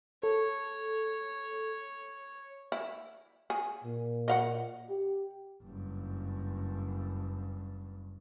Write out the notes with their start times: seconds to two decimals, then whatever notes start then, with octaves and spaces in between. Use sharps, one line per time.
0.23 A4 C#5
2.72 E4
3.50 G#4
3.84 A#2
4.28 D#5 F5 F#5
4.89 G4
5.63 F#1 G2